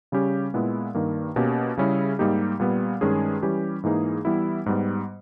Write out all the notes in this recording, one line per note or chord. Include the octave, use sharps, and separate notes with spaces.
C#3 G3 C#4 G4
A#2 G#3 B3 E4
G2 D#3 A#3
B2 A#3 C#4 G4
C#3 G3 C#4 E4 G#4
G#2 G3 A#3 D#4 G4
A#2 G3 B3
G2 D#3 G#3 C#4 G#4
E3 G3 C#4 G4
G#2 E3 A#3 D#4 G#4
E3 G3 B3 E4
G#2 G3 B3